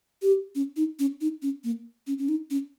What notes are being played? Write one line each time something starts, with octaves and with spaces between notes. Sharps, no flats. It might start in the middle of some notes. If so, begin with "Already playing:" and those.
G4
C#4
D#4
C#4
D#4
C#4
A#3
C#4
C#4
D#4
C#4